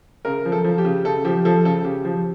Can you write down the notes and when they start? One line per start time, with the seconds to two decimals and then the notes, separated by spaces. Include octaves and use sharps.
0.25 C#3 A#4
0.45 F3
0.52 A4
0.64 F3
0.78 G4
0.85 C#3
1.05 C#3 A4
1.25 F3 G4
1.45 F3 A4
1.65 C#3 A4
1.85 C#3 G4
2.05 F3